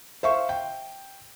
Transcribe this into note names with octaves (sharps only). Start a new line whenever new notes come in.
C5 E5 F5 C#6
G5